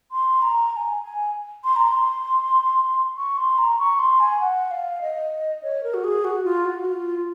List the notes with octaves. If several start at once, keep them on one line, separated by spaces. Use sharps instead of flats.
C6
A#5
A#5
G#5
G#5
C6
A#5
C6
C#6
C6
A#5
C#6
C6
G#5
F#5
F5
D#5
C#5
A#4
F#4
G#4
F#4
F4
F#4
F4
F4